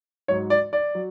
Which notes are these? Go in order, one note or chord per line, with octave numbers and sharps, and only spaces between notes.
G#2 F#3 C#5
D5
D5
F#3